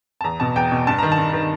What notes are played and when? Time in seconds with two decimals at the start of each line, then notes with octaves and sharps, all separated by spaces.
0.21 A5
0.24 E2 A#5
0.40 B2 A5
0.56 E2 G5
0.72 B2
0.87 G2 A5
0.98 D#3 A#5
1.12 A5
1.18 G2
1.33 D#3